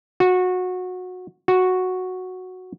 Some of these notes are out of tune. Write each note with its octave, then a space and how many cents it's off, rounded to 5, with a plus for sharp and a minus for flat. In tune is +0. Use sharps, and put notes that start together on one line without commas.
F#4 -20
F#4 -5